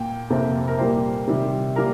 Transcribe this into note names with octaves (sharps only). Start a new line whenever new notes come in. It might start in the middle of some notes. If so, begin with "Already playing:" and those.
Already playing: A#2 A#3 G5
F2 C3 F3 A#3
A#4
A#2 G3 A#3 C5
C3 D#3 G3
G3 A#3 A#4